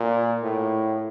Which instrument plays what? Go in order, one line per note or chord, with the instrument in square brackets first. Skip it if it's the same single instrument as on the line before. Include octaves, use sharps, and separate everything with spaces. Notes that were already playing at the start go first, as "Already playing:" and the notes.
Already playing: [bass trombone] A#2
A2